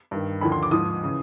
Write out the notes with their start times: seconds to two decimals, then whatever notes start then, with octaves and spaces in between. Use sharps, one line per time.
0.11 G2 D#3
0.41 D#2 D3 F3 B5
0.52 C6
0.63 D6
0.71 G#2 F3 D#6
1.03 C#3 E3